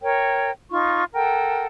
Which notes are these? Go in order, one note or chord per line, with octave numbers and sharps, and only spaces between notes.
A#4 C#5 G5
D#4 F4 C#6
A4 A#4 F#5 G5